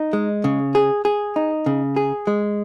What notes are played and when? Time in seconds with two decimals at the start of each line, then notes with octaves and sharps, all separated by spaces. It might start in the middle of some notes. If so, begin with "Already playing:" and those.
Already playing: D#4
0.13 G#3
0.44 C#3
0.75 G#4
1.05 G#4
1.36 D#4
1.66 C#3
1.96 G#4
2.27 G#3